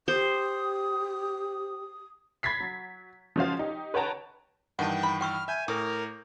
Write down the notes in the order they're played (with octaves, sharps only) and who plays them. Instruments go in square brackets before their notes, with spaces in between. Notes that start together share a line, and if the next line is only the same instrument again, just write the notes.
[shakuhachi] G4 [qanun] C5 [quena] D#6
[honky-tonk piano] B5 G#6 A6 B6 C7
F#3
F3 G#3 C#4 F#4 C5 F5
D#4 G4
B4 C#5 F#5 G5 A5 A#5
[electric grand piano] G2 D#3 E3 [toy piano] F#5 A5 [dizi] G5
[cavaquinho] B5
[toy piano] G5 C#6 E6 [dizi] F6
[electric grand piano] E5 G6 [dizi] G#5
[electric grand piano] A2 [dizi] A#4 [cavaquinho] D6